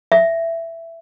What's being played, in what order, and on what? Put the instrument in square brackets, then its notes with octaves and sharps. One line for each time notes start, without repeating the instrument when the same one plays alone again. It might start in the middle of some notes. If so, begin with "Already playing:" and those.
[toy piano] E5